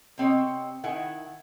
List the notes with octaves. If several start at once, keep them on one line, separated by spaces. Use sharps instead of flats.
C3 C4 C#5 D#5
D#3 E4 F#5 G#5